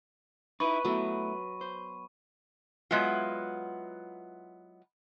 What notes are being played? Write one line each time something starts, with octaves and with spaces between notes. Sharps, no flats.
D#4 E4 B4 B5 C#6 D#7
F#3 A3 B3 E4
C5
F#3 G#3 B3 E4 F4